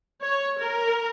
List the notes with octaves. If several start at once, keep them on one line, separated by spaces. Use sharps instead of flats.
C#5
A#4